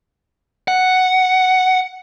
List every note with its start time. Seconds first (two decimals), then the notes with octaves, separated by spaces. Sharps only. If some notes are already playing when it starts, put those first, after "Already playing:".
0.68 F#5